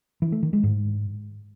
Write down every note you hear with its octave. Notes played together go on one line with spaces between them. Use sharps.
E3
A3
D#3
G#3
G#2